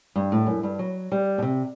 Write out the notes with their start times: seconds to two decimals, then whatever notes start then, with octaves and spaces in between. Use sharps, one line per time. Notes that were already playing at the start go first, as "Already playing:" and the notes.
0.16 G2
0.32 A2
0.47 F#2
0.63 G2
0.79 F#3
1.12 G3
1.38 B2
1.42 C3